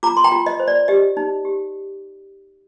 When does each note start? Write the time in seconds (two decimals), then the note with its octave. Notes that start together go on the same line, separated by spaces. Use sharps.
0.03 F4 A#5 D6
0.17 C6
0.24 G5 A#5
0.32 F4
0.46 D#5
0.60 C5
0.68 D5
0.88 G4 D#5
1.17 D#4
1.45 G4